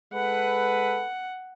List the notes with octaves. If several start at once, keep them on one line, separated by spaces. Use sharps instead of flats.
G#3 A4 B4 F#5